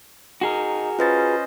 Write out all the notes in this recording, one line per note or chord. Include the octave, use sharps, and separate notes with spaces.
D#4 F#4 G#4 A#4
C#4 F4 B4 C5 D#5 A6